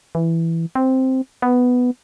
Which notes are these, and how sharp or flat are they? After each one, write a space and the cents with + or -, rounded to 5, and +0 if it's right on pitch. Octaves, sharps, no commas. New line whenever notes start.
E3 +5
C4 +0
B3 +5